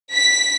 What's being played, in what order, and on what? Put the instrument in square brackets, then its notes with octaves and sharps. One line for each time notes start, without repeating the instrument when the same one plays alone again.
[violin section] B6